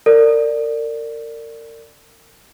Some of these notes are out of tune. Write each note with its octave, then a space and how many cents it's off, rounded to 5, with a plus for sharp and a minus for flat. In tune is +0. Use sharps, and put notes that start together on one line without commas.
A#4 -35 D5 +0